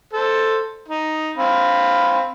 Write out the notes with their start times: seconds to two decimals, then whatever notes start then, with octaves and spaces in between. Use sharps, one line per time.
0.13 A4 C5
0.88 D#4
1.38 C4 F5 B5